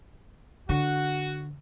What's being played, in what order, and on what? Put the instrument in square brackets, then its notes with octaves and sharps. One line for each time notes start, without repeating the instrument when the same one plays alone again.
[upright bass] D3 [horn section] F#4